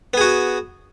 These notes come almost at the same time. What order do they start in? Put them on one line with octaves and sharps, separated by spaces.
B3 G#4 F#4